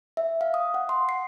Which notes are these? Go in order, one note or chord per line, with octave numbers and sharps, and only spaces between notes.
E5
F5
D#6
F#5
C6
C7